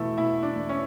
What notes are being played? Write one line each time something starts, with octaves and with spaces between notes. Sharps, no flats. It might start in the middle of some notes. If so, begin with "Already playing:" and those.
Already playing: E2 B2 A3 E4
B2 E4
D4
E2
C#4